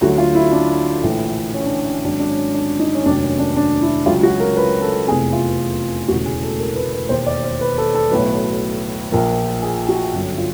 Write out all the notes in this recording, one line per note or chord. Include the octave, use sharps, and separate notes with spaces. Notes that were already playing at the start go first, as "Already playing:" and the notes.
D2 D3 F#3 F#4
F4
E4
D4
A#1 A2 E3
C#4
D4
G#1 G#2 D#3 F#3 D4
D4
C#4
D4
D#4
C#4
F1 D#2 D#3 F#3 D4
C#4
D4
D4
E4
C#2 C#3 F#3 F4
F#4
A#4
B4
A4
F1 E2 C3 G#4
F4
E1 D2 C#3 E3 F#4
G#4
A4
A#4
B4
B4
E1 D#2 D#3 C5
D5
C5
B4
A4
A4
B1 A2 F#3 B4
A#1 A#2 F3 A#4
G#4
F#4
G1 F#2 D3 F#3
F4